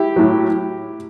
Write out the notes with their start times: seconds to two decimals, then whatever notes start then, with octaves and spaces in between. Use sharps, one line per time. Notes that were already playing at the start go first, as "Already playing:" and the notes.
Already playing: E4 G4
0.16 A2 F#3